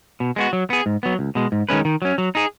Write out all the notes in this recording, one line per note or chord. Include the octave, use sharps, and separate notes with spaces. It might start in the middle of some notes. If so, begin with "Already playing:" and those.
B2
G#3 B3 F#4
F#3
B3 G#4
G#2
F#3 B3
C#2
B2 G#3
G#2
D#3 G#3 C#4 B4
D#3
F#3 C#4
F#3
D#4 G#4